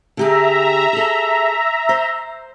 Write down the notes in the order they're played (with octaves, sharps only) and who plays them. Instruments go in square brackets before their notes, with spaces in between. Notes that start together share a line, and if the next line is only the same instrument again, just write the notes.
[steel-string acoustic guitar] D3 G4 G#4 [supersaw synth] E5 A#5
[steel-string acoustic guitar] G#4 A4
C5